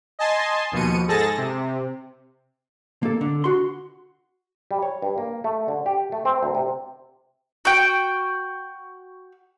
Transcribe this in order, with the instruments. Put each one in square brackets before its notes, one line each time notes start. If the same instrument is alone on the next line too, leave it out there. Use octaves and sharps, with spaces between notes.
[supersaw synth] D#5 G#5 A5 C6
D#2 B2 F3 C#7 D#7
G#2 G#4 A4 A5 A6 A#6
C3
[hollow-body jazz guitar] A#3 A4
D3
F#4 C6
[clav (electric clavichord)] G3
C#5
G2
A#3
A3
D3
G4
A3
C4
D2
C3
[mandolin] F#4 G5